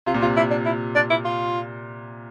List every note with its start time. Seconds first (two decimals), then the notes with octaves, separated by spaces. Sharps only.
0.06 C3 F4
0.14 A#2
0.21 C3 F4
0.37 E4
0.51 D4
0.66 E4
0.95 D4
1.10 E4
1.25 F4